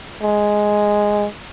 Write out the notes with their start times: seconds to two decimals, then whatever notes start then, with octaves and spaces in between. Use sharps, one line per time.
0.23 G#3